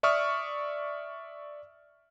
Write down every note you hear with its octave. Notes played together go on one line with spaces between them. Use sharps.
D5 E5 C#6 D#6 F6